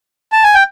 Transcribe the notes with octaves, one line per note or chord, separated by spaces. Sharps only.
A5
G#5
G5